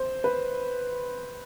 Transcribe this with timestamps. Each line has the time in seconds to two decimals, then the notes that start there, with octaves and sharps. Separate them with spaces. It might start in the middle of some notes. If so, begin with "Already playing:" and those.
Already playing: C5
0.24 B4